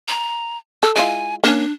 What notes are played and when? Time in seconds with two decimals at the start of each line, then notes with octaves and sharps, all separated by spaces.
0.08 A#5
0.83 A4 E6
0.96 G#3 E4 F4 G#5
1.44 A#3 C#4 D4